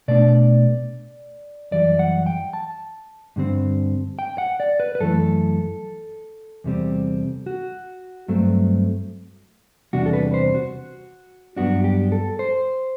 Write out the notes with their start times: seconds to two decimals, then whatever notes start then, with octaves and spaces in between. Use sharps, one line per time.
0.08 B2 A3 D4 D5
1.71 F#2 E3 G3 D5
1.99 F#5
2.26 G5
2.53 A5
3.36 G2 D3 G3 C4
4.19 G5
4.38 F#5
4.60 D5
4.80 B4
4.95 B4
5.00 F#2 E3 A3 A4
6.64 E2 C3 G3 C4
7.46 F#4
8.28 G2 F#3 A3 C4
9.93 E2 C3 G3 D4 F#4
10.06 A4
10.13 B4
10.34 C5
10.55 F#4
11.56 G2 F#3 B3 D4 F#4
11.84 G4
12.12 A4
12.39 C5